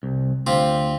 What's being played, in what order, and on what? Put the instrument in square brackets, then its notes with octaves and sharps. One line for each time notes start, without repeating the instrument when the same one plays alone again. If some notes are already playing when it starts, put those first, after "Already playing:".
[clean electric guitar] C2
[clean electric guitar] D2 [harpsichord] C4 F4 G4